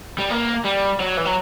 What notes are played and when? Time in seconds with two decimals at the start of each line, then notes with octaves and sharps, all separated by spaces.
0.18 G3
0.30 A#3
0.65 G3
1.00 F#3
1.17 E3
1.25 F#3